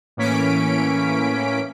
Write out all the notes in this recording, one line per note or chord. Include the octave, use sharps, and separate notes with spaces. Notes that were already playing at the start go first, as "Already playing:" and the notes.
A2 E3 A#3 C#4 B6 D7